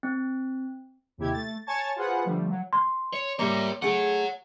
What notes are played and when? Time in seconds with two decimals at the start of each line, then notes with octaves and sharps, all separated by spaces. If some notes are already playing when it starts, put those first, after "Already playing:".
0.03 C4
1.17 D#2 C3 E4 G4 G#6
1.33 A3 A6
1.66 C#5 G#5 A5 C#6 G#6 A6
1.96 F4 F#4 G#4 B4 C5 F#5
2.24 D3 F3 G3 A3
2.49 F#3
2.73 C6
3.13 C#5
3.39 G3 A#3 C#5 E5
3.82 A3 G#4 C#5 F#5